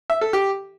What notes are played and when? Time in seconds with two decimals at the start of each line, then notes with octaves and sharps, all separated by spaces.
0.10 E5
0.21 A4
0.33 G4